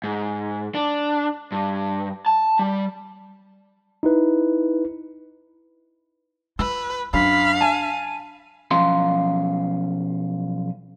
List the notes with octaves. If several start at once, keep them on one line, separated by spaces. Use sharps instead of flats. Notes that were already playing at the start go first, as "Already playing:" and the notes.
G#2
D4
G2
A5
G3
D#4 E4 B4
F4 B4 E6
F#2 D4 F5 B5
G#5 A5 D#7
B1 F3 C#4 F5 A#5 C6